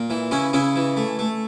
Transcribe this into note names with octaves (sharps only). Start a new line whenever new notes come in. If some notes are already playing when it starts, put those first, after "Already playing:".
Already playing: A#2
E3
C#3 C#4 E4
C#3 C#4 E4
E3
A3
A3